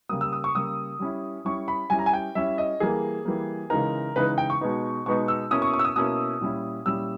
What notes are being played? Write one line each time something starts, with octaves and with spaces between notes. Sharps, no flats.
C#3 G3 A#3 D#6
E6
D#6
C#6
C#3 G3 A#3 D#6
G3 C#4 E4
G3 C#4 E4 C#6
B5
G3 C#4 E4 G#5
A#5
G#5
G5
G3 C#4 E4 E5
D#5
E3 G3 A#3 G#4
E3 G3 A#3
C#3 E3 G#3 D#4 A#4
C#3 E3 G#3 D#4 B4
G5
C#6
B2 G#3 B3 D#4
B2 G#3 B3 D#4 C#6
E6
B2 A#3 C#4 E4 D#6
C#6
C#6
E6
D#6
B2 A#3 C#4 E4 D#6
A#2 G3 C#4 E4
A#2 G3 C#4 E4 E6